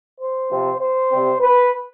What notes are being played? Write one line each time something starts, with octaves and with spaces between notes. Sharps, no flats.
C5
C3 F3 C4
C5
C3 G3 C4
B4